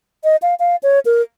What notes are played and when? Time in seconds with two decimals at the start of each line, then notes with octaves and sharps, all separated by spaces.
0.24 D#5
0.42 F5
0.59 F5
0.83 C#5
1.05 A#4